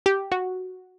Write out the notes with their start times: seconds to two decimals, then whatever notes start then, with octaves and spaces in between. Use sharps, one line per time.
0.06 G4
0.32 F#4